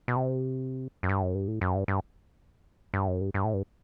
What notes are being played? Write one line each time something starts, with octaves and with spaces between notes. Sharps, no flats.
B2
C3
F#2
G2
F#2
G2
A2
F#2
G2
G2
G2
F#2
G2
G2
A2
G2